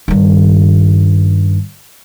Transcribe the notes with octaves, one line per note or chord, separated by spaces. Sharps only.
G2 D#3